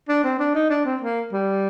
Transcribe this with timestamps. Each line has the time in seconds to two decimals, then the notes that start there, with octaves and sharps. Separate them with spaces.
0.09 D4
0.24 C4
0.39 D4
0.55 D#4
0.70 D4
0.85 C4
1.01 A#3
1.32 G3